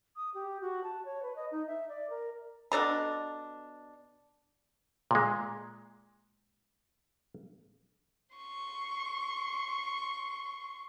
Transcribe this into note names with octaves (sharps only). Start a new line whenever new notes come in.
D#6
G4
F#4
A5
C#5
B4
D#5
D#4
E5
D5
A#4
B2 D4 A4 A#5
A#2 G#3
C6 C#6